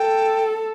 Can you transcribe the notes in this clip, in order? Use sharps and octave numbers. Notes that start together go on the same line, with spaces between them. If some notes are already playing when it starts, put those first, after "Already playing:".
Already playing: A4 G5